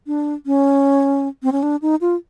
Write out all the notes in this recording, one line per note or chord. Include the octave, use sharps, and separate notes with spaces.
D4
C#4
C4
C#4
D4
D#4
F4